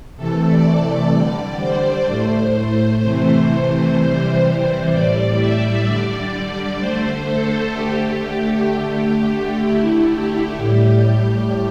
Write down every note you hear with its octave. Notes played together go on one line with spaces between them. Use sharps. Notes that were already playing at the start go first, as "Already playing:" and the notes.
C3 E3 A3 A4
D5
D5
D3 G3 D5
C5
A2 A3 C5
C5
C3 E3 A3
C3 E3 G3 C5
C5
A2 G3 D5
E5
D3 G3 D5
D3 A3 C5
A4
D3 A3 G4
D3 A3
D3 A3 E4
G4
A2 G3